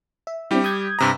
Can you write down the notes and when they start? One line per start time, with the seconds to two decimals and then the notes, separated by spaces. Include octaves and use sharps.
0.27 E5
0.51 G3 C4 D4 E4 G4
0.64 D#6 G6 G#6
0.99 G2 C3 A#5